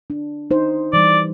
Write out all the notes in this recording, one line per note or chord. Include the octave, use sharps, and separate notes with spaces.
D4
D#4 C5
E3 G3 D5